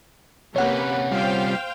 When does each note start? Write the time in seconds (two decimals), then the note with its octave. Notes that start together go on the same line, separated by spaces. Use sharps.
0.56 C3 A#3 C#4 G4 B4 C#5 F#5
1.11 G3 F4 C5 F5 G5